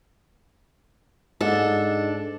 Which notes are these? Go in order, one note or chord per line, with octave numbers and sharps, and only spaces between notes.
G#2 D4 A4